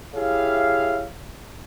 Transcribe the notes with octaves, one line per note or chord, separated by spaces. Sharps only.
E4 G4 G#4 C#5 E5 F5